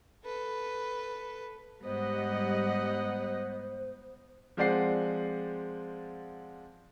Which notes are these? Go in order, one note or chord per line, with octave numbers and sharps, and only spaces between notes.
A4 B4
G#2 G3 B3 C5 D#5 F#5
F3 G#3 C4 D5 F#5 C7